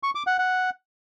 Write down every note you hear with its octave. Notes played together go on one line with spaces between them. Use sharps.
C#6
D6
F#5
F#5